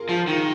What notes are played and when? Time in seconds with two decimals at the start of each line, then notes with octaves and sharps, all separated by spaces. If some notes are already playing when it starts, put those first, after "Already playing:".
Already playing: F4 G#4 A#4
0.09 F3
0.27 D#3